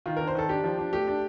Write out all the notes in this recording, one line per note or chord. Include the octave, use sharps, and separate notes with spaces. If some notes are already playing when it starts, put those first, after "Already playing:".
D#3 F4
D4 A#4
C5
D#3 A4
D4 G4
F3
D4
A3 G4
D4